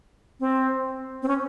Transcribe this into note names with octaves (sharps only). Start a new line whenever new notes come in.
C4
C4
C#4